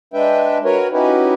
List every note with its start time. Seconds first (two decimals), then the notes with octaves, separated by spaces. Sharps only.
0.14 G#3 D4 B4 E5 G5
0.64 F#4 A#4 B4 C#5
0.92 C#4 D#4 E4 F#4 G4 B4